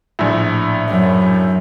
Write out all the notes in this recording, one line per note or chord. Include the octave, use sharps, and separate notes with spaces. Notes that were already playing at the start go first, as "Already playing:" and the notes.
A#1 A2
F#2